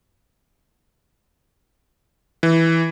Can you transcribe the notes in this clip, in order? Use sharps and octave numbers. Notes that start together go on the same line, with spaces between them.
E3